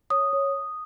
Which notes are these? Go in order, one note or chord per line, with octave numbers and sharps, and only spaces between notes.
C#5 D#6
C#5